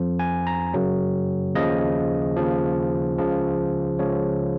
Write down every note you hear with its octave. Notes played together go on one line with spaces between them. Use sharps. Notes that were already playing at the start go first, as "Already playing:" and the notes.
Already playing: F2 F3
G#5
A#5
F#2 C#3 F#3
D#2 C#3 F3 D#5
D#2 C#3 F3
C#2 C#3 F3
C#2 C#3 F3 C#5